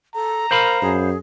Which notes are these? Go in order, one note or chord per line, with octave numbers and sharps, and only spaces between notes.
A4 A#5
A#4 C5 F5 B5
F#2 G#4